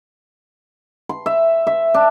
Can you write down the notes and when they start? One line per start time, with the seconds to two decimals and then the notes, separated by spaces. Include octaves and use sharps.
1.09 C6
1.26 E5
1.67 E5
1.94 D4